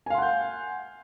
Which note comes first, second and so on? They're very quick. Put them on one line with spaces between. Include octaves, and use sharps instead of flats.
G#5 F5 C6 F#5 G6